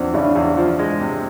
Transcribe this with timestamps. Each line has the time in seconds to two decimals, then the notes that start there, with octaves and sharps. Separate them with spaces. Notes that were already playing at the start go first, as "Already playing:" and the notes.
Already playing: E2 F3 C4 D4
0.14 C#3 D4 E4
0.35 E2
0.57 F3
0.79 G#3
1.00 C3